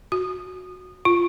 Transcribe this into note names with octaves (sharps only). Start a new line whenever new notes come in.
F#4
F4